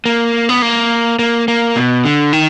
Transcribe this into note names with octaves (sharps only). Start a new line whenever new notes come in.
A#3
B3
A#3
A#3
A#3
B2
D3
D#3